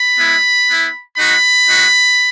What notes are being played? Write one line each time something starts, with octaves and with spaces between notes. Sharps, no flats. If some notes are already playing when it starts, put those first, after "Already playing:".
Already playing: B5
G#3 B3 E4
B3 E4
G#3 D#4 F#4 B5
G#3 D#4 F#4